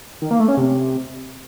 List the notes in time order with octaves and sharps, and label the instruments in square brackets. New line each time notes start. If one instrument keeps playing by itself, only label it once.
[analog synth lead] D#3
A#3
A3
C#4
C3